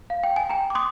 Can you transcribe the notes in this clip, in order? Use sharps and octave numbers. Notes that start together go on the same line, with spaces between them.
F5
G5
G#5
G5 A#5
D6
C6 D#6